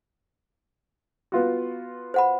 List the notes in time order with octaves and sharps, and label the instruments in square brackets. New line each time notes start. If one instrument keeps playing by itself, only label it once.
[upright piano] B3 F4 F#4
[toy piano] C5 F#5 B5